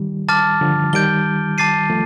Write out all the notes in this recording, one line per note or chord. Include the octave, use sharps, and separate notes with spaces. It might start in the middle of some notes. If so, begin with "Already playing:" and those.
Already playing: D#3 G3
A5 D6 F6 A6
D3 F3
D#3 G3 G6 D7 G7
A5 D6 A6 C7 D#7
F3 A3